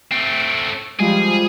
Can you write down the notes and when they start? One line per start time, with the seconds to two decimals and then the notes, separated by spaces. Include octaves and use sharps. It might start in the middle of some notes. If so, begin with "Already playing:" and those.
0.12 A3 C4
1.00 F3 G3 G#3 F4 G#4